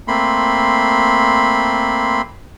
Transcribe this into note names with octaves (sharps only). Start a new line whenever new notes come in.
A3 A#3 C4 B5 C6